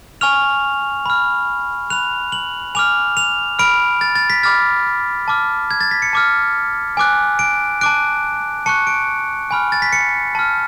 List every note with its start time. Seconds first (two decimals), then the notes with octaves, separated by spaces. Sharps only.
0.21 G#5 C#6 F6 F7
1.06 B5 F6
1.90 B5 F#6 F7
2.32 F#7
2.75 G#5 D6 F6 F7
3.17 F7
3.59 B5 F6 D7
4.01 A6
4.15 A6
4.30 B6
4.43 B5 D6 F6 A6
5.28 A5 D6 F6
5.71 G#6
5.81 A6
5.91 B6
6.02 C#7
6.13 A5 D6 F6
6.97 G#5 D6 F#6
7.39 D7
7.81 A5 D6 F#6 D7
8.66 A5 C#6 F#6 C#7
8.87 D7
9.51 G#5 B5 F6
9.72 A6
9.82 B6
9.93 C#7
10.35 A5 F6